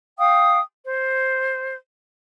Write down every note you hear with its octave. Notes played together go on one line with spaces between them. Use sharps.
F5 G5 D#6
C5